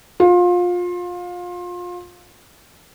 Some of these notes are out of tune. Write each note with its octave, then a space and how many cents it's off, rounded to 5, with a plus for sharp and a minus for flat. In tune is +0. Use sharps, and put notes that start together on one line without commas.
F4 +25